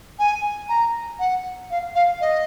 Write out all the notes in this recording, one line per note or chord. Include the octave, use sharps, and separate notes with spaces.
G#5
A#5
F#5
F5
F5
D#5